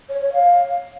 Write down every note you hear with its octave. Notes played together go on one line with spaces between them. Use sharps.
C#5
C#5
F5